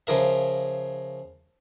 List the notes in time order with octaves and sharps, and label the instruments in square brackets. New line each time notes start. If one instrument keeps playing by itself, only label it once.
[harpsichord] C#3 F3 A#4 E5